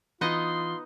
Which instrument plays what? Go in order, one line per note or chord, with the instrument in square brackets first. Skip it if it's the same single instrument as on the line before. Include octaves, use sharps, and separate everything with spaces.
[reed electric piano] E3 [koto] B3 D#4 D#5 [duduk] F4 [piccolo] C6